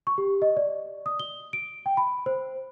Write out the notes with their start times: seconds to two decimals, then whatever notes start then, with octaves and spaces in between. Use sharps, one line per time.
0.07 C#6
0.18 G4
0.42 D#5
0.57 D5
1.06 D#6
1.20 G7
1.53 D7
1.86 G5
1.97 B5
2.26 C5